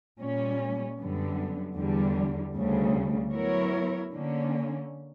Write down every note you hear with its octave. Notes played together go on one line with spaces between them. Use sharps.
A#2 G3 C#4
F#2 D3 G3 B3
E2 D3 G3
D2 C#3 G3
F#3 B3 E4 A#4 C#5
D3 A#3 C#4